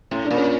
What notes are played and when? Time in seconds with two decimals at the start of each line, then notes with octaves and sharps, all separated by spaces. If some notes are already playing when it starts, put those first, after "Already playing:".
0.11 A2 C#4
0.24 D4
0.31 A#2
0.37 C#4